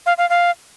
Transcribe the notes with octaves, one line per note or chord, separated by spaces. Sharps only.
F5
F5
F5